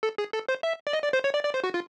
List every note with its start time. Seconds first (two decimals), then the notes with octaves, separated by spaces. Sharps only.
0.03 A4
0.18 G#4
0.33 A4
0.49 C5
0.63 E5
0.87 D5
0.93 D#5
1.04 D5
1.13 C5
1.24 C#5
1.34 D5
1.44 D5
1.54 C5
1.64 F#4
1.74 F4